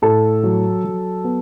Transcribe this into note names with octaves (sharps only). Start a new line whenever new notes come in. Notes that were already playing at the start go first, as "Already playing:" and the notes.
A2 A4
F#3
F#3
B3